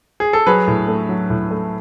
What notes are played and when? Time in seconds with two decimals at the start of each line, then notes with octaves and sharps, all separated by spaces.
0.20 G#4
0.33 A4
0.47 F#3 G#4 B4
0.68 A2
0.88 A3
1.09 F#3
1.30 A2
1.51 A3